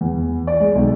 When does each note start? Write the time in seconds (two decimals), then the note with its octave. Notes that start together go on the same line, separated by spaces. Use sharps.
0.01 E2
0.47 D5
0.60 G#3
0.75 B1